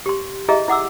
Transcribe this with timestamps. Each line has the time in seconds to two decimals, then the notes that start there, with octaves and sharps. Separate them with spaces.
0.06 G4 C6
0.48 E4 G4 G#4 D#5 E5 A#5
0.68 E4 F#5 D6 E6